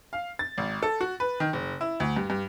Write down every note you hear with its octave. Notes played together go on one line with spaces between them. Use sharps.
F5
A6
G#1
A4
F#4
B4
D#3
F#1
E4
D2
G2
G2